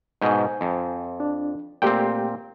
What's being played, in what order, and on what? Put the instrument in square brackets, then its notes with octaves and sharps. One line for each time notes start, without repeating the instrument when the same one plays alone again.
[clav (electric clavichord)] G#2 B2 [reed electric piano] C5 G#5 G6
[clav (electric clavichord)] F2
[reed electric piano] D4
[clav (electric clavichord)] A#2 C4 [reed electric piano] A3 G4 G5